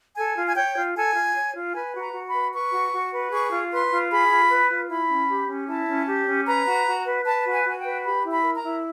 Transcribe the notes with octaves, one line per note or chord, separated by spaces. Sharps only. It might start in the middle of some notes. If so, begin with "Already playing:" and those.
A4 G#5
F4
G#5
C#5 G5
F4
A4 G#5
F4
C#5
F4
B4 G#5
F#4
A#5
F#4
B5
B4
B4 C#6
F#4
F#4
B4
G#4 C#6
F4
B4 C6
F4
G#4 B5
F4
B4
F4
E4 B5
C#4
G4
C#4
E4 A5
C#4
G4
C#4
B4 A#5
F#4
F#4
B4
B4 A5
F#4
G#5
F#4 G#5
G5
B4
G4 B5
E4
B5
A#4
A#5
E4